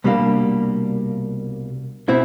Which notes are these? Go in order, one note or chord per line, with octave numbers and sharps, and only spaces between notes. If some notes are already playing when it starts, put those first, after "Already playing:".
C2 B2 G3 A#3 D4
B2 C4 E4